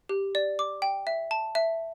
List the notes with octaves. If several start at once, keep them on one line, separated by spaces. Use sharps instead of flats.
G4
D5
D6
G5
E5
A5
E5